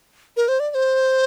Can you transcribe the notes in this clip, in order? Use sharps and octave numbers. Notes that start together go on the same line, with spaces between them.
A#4
C5
D5
D5
C5